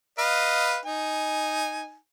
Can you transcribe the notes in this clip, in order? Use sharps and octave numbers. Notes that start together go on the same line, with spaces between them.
B4 D#5 F5
D#4 G#5